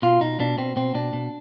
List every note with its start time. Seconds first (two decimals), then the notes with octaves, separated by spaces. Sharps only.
0.02 B2 F4
0.21 B2 D#4
0.40 B2 D4
0.58 B2 C4
0.76 B2 C4
0.95 B2 D4
1.13 B2